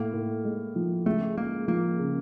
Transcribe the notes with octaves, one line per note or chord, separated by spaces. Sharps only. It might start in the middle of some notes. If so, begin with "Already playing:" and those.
Already playing: A2 A#3
A2
G#3
F3
C#2 A3
G#3 A#3
F3 A#3
C#3